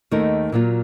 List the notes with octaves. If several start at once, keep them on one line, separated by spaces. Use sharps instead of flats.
D#2 D#3 A3 D#4 A#4
A#2 F#3 A#3 F4